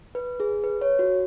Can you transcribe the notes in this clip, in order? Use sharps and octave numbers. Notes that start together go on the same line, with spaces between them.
B4
G#4
B4
C#5
F#4